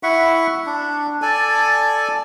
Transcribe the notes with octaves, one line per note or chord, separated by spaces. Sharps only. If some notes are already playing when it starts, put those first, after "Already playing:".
E4 E5 F#5 C#6
D4
A4 D5 G#5 A5